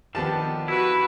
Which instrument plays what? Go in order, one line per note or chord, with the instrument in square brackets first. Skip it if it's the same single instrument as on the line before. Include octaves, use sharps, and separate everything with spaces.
[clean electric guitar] D3 D#3 F3 [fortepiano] B3 G4 A5
[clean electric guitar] E4 [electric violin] F#4 B4